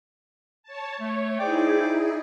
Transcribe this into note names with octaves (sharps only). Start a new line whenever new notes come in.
C#5 A5
A3 C#5
D#4 E4 G#4 C5 D5 G5